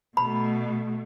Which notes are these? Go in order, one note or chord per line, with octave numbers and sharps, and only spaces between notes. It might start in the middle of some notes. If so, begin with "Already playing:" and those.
B2 A3 B5